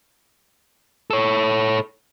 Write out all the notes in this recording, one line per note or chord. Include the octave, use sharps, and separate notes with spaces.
A4 C#5